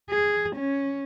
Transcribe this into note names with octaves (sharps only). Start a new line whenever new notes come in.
G#4
C#4